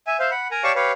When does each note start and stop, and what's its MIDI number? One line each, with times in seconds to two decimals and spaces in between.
0.07 0.17 76
0.07 0.17 80
0.20 0.30 72
0.20 0.30 76
0.20 0.30 77
0.31 0.48 78
0.31 0.48 83
0.51 0.63 70
0.51 0.63 80
0.51 0.63 82
0.64 0.72 67
0.64 0.72 73
0.64 0.72 74
0.64 0.72 77
0.64 0.72 81
0.64 0.72 85
0.75 0.92 67
0.75 0.92 71
0.75 0.92 73
0.75 0.92 77